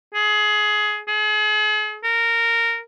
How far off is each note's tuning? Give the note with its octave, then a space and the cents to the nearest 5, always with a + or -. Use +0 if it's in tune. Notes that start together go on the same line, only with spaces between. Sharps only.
G#4 +20
G#4 +40
A#4 -15